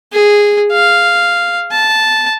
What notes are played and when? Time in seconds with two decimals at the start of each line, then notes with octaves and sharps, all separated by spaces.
0.13 G#4
0.73 F5
1.72 A5